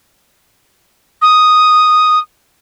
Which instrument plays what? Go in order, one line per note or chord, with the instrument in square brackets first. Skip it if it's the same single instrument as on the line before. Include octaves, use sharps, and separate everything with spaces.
[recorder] D#6